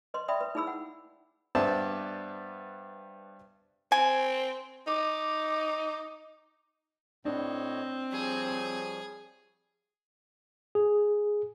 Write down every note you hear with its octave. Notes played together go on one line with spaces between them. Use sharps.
B4 D#5 C6
D5 E5 G5 B5 D#6
B4
D#4 E4 G#4 B5 E6
F#5
G2 B3 C5 D5 E5 A5
C4 G#5
D#4 D6
A2 C4 D4 C#5 D#5
F3 G3 G#4 C#5
G#4